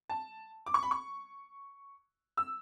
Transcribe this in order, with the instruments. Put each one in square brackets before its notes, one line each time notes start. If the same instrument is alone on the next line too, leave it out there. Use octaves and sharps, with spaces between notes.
[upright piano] A5
D6
C#6
B5
C#6
E6